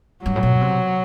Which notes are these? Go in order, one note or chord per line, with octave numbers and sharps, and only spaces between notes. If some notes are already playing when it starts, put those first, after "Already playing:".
G2 F#3
A2
B2
C3